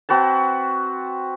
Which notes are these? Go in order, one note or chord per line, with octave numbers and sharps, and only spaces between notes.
C4 F#4 B4 A5